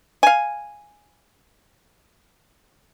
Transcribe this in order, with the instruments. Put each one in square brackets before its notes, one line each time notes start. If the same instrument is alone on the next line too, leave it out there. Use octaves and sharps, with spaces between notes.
[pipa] F5 G#5